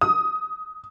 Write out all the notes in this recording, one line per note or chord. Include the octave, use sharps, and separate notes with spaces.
D#6